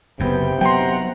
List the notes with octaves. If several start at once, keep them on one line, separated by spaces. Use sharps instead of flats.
F#1 F#2 C3 B3 G5
F#3 B3 F#5 G5 A#5 C6